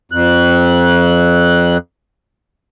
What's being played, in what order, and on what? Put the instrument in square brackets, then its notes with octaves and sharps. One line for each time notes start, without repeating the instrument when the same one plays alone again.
[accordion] F2 F#6